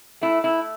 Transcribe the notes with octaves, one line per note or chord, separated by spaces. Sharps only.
A3 E4
A3 E4